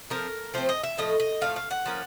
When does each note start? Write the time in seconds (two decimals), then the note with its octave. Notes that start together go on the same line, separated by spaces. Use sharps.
0.10 F3 A3 C4 A#4
0.54 F3 A3 C4 C5
0.69 D#5
0.84 E5
0.98 A2 F3 A3 D#5
1.20 D#5
1.41 A2 F3 A3 F5
1.56 F5
1.71 F#5
1.86 F3 A#3 C#4